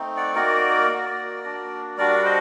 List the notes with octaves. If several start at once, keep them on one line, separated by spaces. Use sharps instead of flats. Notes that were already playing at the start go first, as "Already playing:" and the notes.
Already playing: A3 C4 D#4
D5 F#5
A#3 D#4 F#4 A#4 D5
A#3 F#4
A#3 D4 F#4
G3 D4 F#4 A#4 D5
F#5
C5 D#5